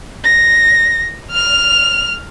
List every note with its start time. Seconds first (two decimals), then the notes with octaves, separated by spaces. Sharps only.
0.24 A#6
1.31 F6 F7